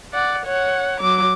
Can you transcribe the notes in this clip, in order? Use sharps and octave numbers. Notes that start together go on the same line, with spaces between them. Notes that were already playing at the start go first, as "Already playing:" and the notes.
D5 F#5
C#5 F#5
F#3 D6